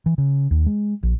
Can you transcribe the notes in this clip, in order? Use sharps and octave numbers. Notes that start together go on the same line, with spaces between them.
E3
C#3
D#2
G#3
A#1